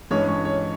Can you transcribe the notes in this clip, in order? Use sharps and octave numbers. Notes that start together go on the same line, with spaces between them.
G2 E3 G#3 C#4 C#5
C#5
C#5